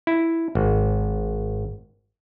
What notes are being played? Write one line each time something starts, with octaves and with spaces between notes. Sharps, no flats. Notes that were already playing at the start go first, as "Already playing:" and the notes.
E4
G#1